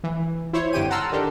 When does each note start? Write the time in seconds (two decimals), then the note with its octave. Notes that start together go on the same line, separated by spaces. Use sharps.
0.04 E3
0.53 E4 C5 C#5
0.73 G2 D3 C4 G4 G5 D#7
0.90 F#5 A5 A#5 C6 E6 F6
1.12 D#3 D4 G4 A4 A#4